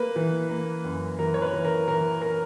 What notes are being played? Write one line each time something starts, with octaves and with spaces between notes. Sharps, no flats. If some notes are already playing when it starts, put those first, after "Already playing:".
Already playing: A#3 B4
E3
A#3
F#2
E3 A#4
C#5
B4
E3
A#4
E3 A#4
A#4